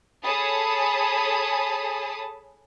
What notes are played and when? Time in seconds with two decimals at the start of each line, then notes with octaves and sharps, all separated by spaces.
0.24 G#4 A4 C#5 A5 B5 D#6